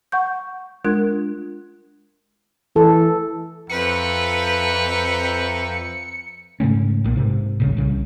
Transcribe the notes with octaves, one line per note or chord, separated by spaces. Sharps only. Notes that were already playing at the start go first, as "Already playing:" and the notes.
F#5 C#6 G6
G#3 D4 F4 A#4 F#6 G#6
E3 A4
F2 B4 E5 G5 A#5 C#7
G#2 C#3 A3 C#4
B1 A#2
G#2 C3
D#1 A#1 C#3
C2 C#3